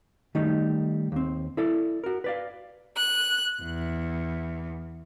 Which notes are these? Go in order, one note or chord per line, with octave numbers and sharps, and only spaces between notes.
D#3 G3 A3 D#4
D#2 C4
E4 A4 D5
F#4 A#4
B4 D5 F5
F#6
E2